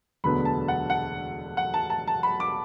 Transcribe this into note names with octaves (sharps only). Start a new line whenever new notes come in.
E1 D2 D3 F#3 B3 B5
A5
F#5
F#5
F#5
A5
A5
A5
B5
D6